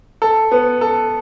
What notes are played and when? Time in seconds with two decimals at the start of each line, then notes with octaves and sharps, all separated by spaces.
0.22 A4
0.51 B3
0.81 A4